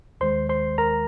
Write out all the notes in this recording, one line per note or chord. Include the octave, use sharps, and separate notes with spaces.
D#2 D#3 G#3 C5 C6
C5 C6
A#4 A#5